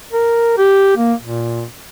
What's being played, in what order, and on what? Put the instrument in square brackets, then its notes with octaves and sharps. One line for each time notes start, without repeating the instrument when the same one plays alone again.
[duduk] A#4
G4
A#3
A#2